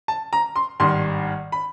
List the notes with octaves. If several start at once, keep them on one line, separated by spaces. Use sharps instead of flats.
A5
A#5
C6
G#1 G2 D#3 C6
B5